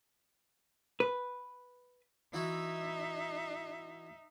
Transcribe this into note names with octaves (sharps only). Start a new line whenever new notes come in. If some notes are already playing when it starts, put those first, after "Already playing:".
B4
E3 D#4 E4 F#4 E5